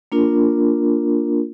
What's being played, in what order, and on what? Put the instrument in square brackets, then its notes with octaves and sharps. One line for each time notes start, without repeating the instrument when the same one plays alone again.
[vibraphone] A#3 D4 F4 A#4